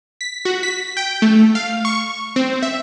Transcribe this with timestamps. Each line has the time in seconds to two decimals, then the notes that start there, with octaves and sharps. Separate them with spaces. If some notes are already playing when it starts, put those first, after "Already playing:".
0.21 B6
0.45 F#4
0.63 B6
0.97 G5
1.22 A3
1.55 F5
1.85 C#6
2.36 C4
2.63 E5